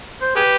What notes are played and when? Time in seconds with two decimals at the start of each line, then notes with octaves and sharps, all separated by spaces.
0.22 C5
0.36 G4 G#4 B4